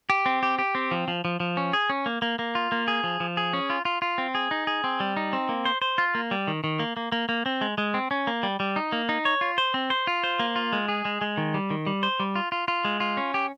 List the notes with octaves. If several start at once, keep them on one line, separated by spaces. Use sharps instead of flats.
G4
C4
G4
G4
C4
F3
F3
F3
F3
C#4
G#4
C#4
A#3
A#3
A#3
F4
A#3
G#4
F3
F3
G#4
C#4
F4
F4
F4
C4
G#4
D#4
G#4
C4
G3
D#4
C4
A#3
C5
C5
F4
A#3
G3
D#3
D#3
A#3
A#3
A#3
A#3
C4
G#3
G#3
C4
C#4
A#3
G3
G3
D#4
A#3
D#4
C#5
F4
C5
C4
C5
F4
C5
A#3
F4
G#3
G#4
G#3
G#3
D#3
G3
D#3
G3
C5
G3
F4
F4
F4
G#3
F4
C#4
G4